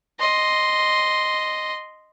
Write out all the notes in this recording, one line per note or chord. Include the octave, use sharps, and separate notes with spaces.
D#5 C6